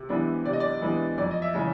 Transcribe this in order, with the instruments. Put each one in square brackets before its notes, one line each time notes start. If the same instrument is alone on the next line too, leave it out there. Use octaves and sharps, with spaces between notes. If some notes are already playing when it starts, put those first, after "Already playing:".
Already playing: [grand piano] C3
E3 G#3 B3 D4
C3 D5
D#5
D5
E3 G#3 B3 D4
F2 D5
D#5
E5
C#3 E3 G#3 C#4